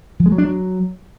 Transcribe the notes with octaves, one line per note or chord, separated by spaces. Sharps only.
F3
G#3
F#3
D4
F#3